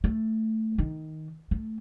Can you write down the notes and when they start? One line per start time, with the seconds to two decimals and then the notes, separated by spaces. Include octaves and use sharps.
0.04 A3
0.78 D#3
1.51 A3